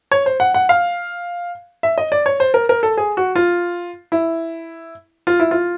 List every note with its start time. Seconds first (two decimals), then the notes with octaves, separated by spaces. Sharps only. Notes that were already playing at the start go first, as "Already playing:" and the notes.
0.12 C#5
0.26 C5
0.40 F#5
0.54 F#5
0.69 F5
1.83 E5
1.98 D#5
2.12 D5
2.26 C#5
2.40 C5
2.54 A#4
2.69 A#4
2.83 A4
2.97 G#4
3.17 F#4
3.36 F4
4.12 E4
5.27 F4
5.40 E4
5.51 F4